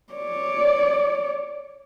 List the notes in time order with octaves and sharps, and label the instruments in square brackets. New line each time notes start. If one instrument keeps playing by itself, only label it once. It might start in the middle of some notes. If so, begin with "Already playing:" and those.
[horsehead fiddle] C#5 D5